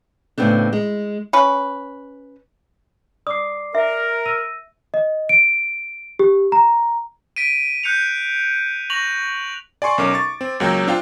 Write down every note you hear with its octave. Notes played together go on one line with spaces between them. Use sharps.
A2 C#3 B3 C4 D4
G#3
C#4 B4
D5 D6 D#6 C7
A#4 E5
E6 A#6 D#7
D#5
D7
G4
A#5
B6 D7 D#7
F#6 G6 C#7 F7
C#6 A#6 F7 F#7
D5 G#5 C6 C#6
B1 C#4 A#4 D6
C#6 A6
C4
C#2 F#3 A#3 G5 E6 G6
C4 D4 F4 F5 G5